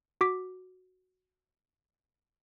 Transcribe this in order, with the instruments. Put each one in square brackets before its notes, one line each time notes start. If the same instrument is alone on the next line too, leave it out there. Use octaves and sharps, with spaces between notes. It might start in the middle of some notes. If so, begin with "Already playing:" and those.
[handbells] F#4 D6 B6